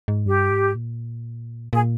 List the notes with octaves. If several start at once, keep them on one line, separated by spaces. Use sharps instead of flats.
G#2
G2 G4
G#2
A#2
A#2 G#4